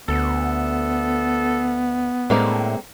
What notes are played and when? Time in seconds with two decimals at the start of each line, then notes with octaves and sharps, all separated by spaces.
0.08 D2 B3 A4
2.30 A2 D3 G#3 A#3 C4